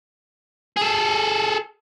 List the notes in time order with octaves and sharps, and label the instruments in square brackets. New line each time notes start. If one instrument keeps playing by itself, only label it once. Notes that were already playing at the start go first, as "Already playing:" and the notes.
[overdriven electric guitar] G#4 A4